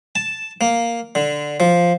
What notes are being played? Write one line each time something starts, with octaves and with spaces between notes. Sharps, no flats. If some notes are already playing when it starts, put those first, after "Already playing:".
A5
A#3
D3
F3